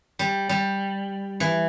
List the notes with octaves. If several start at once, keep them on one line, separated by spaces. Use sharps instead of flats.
G3
G3
E3